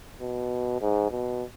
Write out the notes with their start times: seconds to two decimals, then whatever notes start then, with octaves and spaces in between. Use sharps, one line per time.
0.21 B2
0.81 G#2
1.11 B2